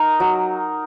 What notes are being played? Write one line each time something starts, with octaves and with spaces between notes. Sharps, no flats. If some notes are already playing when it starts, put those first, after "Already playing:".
Already playing: D#4 A#4
F#3